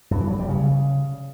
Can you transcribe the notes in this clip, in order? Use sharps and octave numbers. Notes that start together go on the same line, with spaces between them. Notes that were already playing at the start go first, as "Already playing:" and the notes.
G2
E3
F#3
G3
C#3